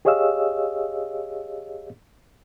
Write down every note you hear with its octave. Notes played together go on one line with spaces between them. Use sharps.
G4 G#4 C#5 D#5 F5 E6